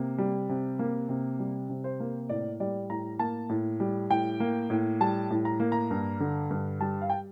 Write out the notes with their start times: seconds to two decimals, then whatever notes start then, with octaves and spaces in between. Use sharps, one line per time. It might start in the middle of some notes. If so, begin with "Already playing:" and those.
Already playing: C3 A#3
0.18 G3
0.49 C3
0.79 A#3
1.09 C3
1.39 G3
1.69 C3
1.84 C5
2.00 A#3
2.29 A2 D5
2.60 G3 D5
2.90 A2 A#5
3.19 A#3 A5
3.49 A2
3.80 G3
4.10 A2 G5
4.40 A#3
4.70 A2
5.00 G3 A5
5.30 A2
5.45 A#5
5.60 A#3
5.72 A#5
5.91 G2
6.20 D3
6.51 G2
6.81 G3 A5
7.01 F5
7.10 G5